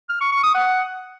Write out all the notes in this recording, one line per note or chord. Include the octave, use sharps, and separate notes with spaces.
F6
C#6
C#6
D#6
F#5